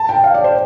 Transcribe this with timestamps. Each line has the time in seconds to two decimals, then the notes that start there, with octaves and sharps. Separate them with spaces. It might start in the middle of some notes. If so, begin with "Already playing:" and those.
Already playing: A5
0.09 G5
0.24 F5
0.34 D5
0.44 C5